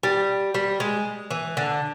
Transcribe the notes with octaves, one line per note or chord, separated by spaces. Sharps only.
G3
G3
G#3
E3
D3